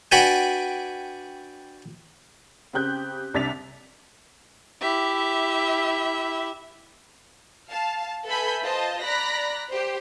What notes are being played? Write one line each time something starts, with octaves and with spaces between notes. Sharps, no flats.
D4 F#4 B4 D5 G5 G#5
C#3 C4 G4 F#6 G6
C2 C3 D4 A6 B6 F7
E4 G4 E5
F5 A5
A4 B4 E5 G#5 B5 G6
F4 C5 D#5 A5
D5 A#5 B5 F#6 A#6 B6
G4 C5